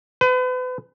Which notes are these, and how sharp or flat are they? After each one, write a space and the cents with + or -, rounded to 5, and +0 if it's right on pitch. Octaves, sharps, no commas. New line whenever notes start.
B4 +40